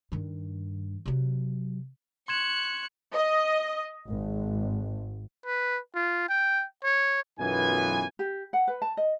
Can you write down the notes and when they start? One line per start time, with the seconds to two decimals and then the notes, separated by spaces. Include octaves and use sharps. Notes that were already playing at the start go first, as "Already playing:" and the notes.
0.12 G2 D#3
1.06 C3 F#3
2.28 C6 C#6 F#6 G#6 E7
3.14 D#5
4.07 G#1
5.46 B4
5.95 F4
6.29 G5
6.84 C#5
7.40 B1 F#2 E3 B3 F4 G#5
8.19 G4
8.53 F#5
8.68 B4
8.82 A5
8.97 D#5